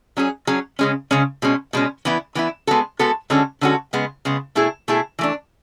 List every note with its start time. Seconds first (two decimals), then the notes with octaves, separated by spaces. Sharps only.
0.17 F#3 C#4 G#4
0.47 F#3 C#4 G#4
0.79 C#3 G#3 C#4
1.11 C#3 G#3 C#4
1.42 B2 G#3 C#4
1.73 B2 G#3 C#4
2.05 E3 B3 E4
2.35 E3 B3 E4
2.67 G#3 B3 F#4 A4
2.99 G#3 B3 F#4 A4
3.30 D3 G#3 C#4 F#4 A4
3.61 D3 G#3 C#4 F#4 A4
3.93 C#3 G#3 B3
4.25 C#3 G#3 B3
4.55 B2 A3 E4 G#4
4.88 B2 A3 E4 G#4
5.19 E3 A3 D4